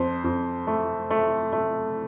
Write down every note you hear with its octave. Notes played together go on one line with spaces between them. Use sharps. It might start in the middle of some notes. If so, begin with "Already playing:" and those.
Already playing: F2 C5
F2
A3
A3
A3